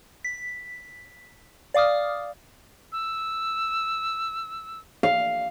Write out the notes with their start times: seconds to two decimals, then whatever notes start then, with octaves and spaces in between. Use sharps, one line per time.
0.25 B6
1.74 D5 F5 D6 D#6 F6
2.92 E6
5.03 F5